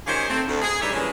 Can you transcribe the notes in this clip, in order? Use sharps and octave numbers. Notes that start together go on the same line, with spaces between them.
D#3 C#4 F4 G4 G#4 C5
A3 C4
D2
G#4
G2 G3 D#4 G4 C#5 E5
G2 A#2 C#3 E3 F3 G#3